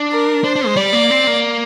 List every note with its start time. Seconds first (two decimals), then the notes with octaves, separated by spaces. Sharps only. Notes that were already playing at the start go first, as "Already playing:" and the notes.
Already playing: D4
0.11 A#4
0.44 D4 C5
0.56 D4
0.66 G#3
0.76 G3 D5
0.93 A#3
1.10 C4
1.27 A#3